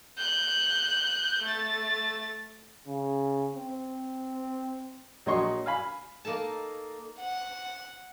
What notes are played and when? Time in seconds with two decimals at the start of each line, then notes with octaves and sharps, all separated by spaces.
0.18 F#6 G6
1.43 A3 A6
2.87 C#3
3.56 C4
5.26 A#1 F#3 C#5 D#5 C6 C#6
5.66 F5 G#5 B5
6.25 A#3 D#4 A4 A5
7.19 F#5